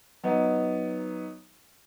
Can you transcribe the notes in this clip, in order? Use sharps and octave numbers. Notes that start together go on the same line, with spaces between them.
F#3 B3 D#4